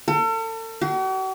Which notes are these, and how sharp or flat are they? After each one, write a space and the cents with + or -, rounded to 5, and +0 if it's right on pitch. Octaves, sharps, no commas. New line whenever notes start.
A4 +40
F#4 +45